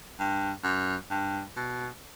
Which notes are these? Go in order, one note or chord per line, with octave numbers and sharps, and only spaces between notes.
G2
F#2
G2
B2